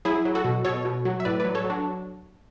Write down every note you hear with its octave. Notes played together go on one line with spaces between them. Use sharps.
F#3 E4 G#4
F#3
F#4 A4
B2
B2 A4 C#5
B2
F#3
E5
A2 B4 D5
F#3 B4 D5
A4 C#5
F#3
D4 F#4